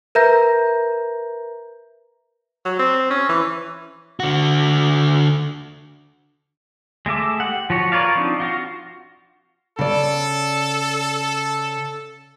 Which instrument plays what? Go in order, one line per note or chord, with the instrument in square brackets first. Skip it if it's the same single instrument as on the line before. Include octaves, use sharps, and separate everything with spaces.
[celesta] A#4 B4 E5 A#5 G6 A#6
[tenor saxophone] F#3
C4
C#4
E3
[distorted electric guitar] D3 F#4
[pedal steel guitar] G#3 A3 E5 D6
G4 F#5
F3 F#4 C#5
A#4 B4 C#5 D5 F5
F3 C4 D4 D#4
F4 F#4 F5
[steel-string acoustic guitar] C#3 D5 [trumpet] A4